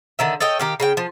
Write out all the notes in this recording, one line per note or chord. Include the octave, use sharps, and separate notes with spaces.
D3 D#3 E5
A4 C#5 D#5 G5
D#3 G4 F5
C#3 C#4 G5
F3